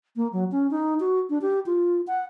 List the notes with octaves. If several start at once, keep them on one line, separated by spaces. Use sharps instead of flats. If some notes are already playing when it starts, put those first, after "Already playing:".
A#3
F#3
C#4
D#4
F#4
D4
G4
F4
F#5